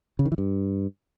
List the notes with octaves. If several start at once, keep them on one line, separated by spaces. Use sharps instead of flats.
C#3
D#3
E3
G2